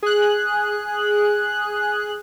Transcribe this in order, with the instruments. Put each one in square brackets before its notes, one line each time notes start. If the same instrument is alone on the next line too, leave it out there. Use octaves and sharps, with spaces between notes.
[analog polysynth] G#4 F#6